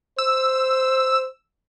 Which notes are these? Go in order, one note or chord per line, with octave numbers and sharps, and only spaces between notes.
C5 E6